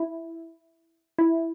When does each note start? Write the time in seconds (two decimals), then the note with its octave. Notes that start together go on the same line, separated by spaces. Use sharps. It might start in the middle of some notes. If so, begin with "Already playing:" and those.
Already playing: E4
1.19 E4